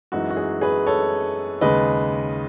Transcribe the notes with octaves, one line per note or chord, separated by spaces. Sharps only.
F#2 E3 G#3 D#4 F#4
F#4
G#4
G#4 B4
A4 C#5
D#2 C#3 G#3 B4 D#5